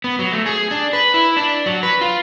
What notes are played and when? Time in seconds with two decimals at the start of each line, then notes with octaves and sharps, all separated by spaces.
0.04 B3
0.19 F#3
0.32 A3
0.46 G#4
0.71 D4
0.93 B4
1.14 E4
1.37 D4
1.66 F#3
1.83 B4
2.01 F4